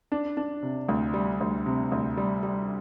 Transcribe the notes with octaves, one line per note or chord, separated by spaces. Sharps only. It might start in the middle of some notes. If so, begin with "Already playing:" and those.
D4
D4
C3
D2
G3
D2
C3
D2
G3
G3